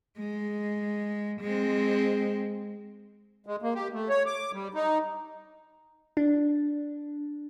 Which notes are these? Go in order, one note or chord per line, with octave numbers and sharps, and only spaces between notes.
G#3
G#3 C4
G#3
A#3
G4
A3
C#5
D6
G3
D#4
D4